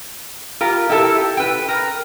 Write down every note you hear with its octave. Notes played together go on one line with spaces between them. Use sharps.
F4 G4 A#4
E4 G4 A4
B4 G5
A#4